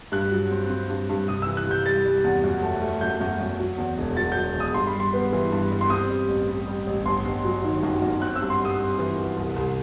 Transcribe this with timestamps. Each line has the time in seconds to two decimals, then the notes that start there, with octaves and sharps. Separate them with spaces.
0.12 G2 F#6
0.31 F#3
0.51 C4
0.70 C4
0.90 G2
1.09 G2
1.27 C3 D#6
1.42 E3 E6
1.57 F#6
1.67 C3 G6
1.86 G3 A6
2.05 G3
2.24 E2
2.44 F#2
2.62 A3
2.82 A3
3.01 F#2 G6
3.20 F#2
3.40 F#2
3.60 F#3
3.78 E2
3.98 E1
4.17 F#3 A6
4.32 F#3 G6
4.55 E1 D#6
4.74 G2 C6
4.87 B5
4.94 G3
5.00 C6
5.13 B3
5.32 E3
5.52 G2
5.71 G3
5.81 C6
5.90 C4 D#6
6.10 G3
6.29 A1
6.48 G3
6.67 G3
6.87 A1
7.05 G1 C6
7.25 G1
7.44 F#3
7.64 D#3
7.83 F#2
8.02 F#2
8.21 C4 F#6
8.36 E6
8.41 G2
8.50 C6
8.60 G3
8.65 D#6
8.79 C4
8.98 E3
9.18 E3
9.37 C2
9.56 C2